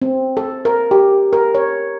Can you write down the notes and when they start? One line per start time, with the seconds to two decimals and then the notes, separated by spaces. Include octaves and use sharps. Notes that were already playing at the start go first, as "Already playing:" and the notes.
0.02 C4
0.37 A4
0.65 A#4
0.91 G4
1.33 A#4
1.55 C#5